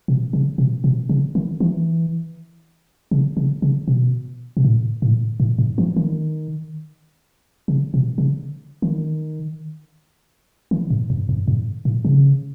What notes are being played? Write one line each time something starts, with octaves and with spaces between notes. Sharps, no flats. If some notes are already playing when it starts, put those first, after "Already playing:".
B2
C#3
B2
B2
C#3
D#3
E3
C#3
C#3
C#3
B2
B2
A2
A2
A2
G#2
E3
D#3
C#3
B2
C#3
D#3
D#3
G#2
F#2
F#2
G#2
A2
C#3